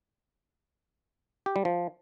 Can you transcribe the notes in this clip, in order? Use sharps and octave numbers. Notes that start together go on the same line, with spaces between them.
G4
G3
F3